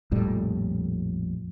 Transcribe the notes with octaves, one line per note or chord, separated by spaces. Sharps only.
A#1 F2 A2 G3